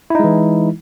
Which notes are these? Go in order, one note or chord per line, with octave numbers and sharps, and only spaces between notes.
E3 G#3 D#4 E4